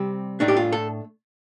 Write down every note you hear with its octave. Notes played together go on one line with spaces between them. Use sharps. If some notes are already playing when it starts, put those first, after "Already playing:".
Already playing: C3 G3 C4
A2 A3 D4 D#4
G4
F4
A4